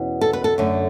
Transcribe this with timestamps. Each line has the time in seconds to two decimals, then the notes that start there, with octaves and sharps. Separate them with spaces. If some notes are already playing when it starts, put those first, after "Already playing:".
Already playing: E2 B2 C#4
0.21 A4
0.33 B4
0.44 A4
0.58 F#2 D3 A3